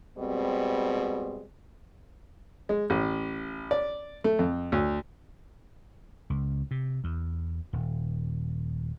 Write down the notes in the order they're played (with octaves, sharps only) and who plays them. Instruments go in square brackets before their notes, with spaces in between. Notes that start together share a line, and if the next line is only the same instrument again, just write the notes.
[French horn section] B2 G3 G#3 C4
[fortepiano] G#3
A1
D5
A3
F2
D2
[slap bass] C#2
C3
E2
D#1